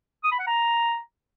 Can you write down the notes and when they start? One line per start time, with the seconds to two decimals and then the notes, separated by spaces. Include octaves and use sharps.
0.24 D#6
0.32 B5
0.39 F#5
0.47 A#5